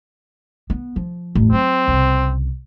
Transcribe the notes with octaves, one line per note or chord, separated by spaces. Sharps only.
B3
F3
A1 F2
F#3 C4
C2 C#3